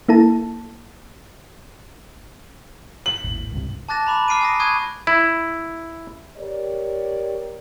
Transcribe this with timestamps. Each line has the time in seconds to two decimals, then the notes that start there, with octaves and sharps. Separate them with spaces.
0.09 A#3 E4 A4 A5
3.06 F#7
3.24 G#1 D#2 A2
3.51 C#2 G2 C3
3.89 A5 D6 F#6 A6 A#6 E7
4.07 A#5 B5 D6 E7
4.28 D6 F6 C7 D7 D#7
4.41 G#5 D#6 A#6
4.59 B5 C#6 D#6 F#6 G#6 D#7
5.07 E4
6.37 G4 A#4 C#5 D5